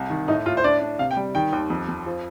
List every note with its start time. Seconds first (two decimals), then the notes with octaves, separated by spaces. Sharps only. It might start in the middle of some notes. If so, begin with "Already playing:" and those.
Already playing: C2
0.10 D#3
0.28 A2 D#4
0.46 A2 F4
0.57 C5
0.64 D4 D5
0.81 D4
0.99 C3 F5
1.11 G5
1.17 G3
1.35 D#3 G5
1.53 D#2
1.70 F2
1.88 F2
2.06 F3